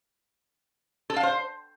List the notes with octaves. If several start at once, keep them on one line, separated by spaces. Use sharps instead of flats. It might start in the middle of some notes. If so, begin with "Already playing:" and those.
A4
F5
C5